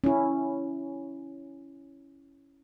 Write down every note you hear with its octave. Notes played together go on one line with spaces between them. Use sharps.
C#4 E4